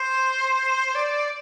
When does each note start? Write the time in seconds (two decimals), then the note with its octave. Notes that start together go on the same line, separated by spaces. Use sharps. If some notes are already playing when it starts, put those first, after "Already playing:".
Already playing: C5
0.95 D5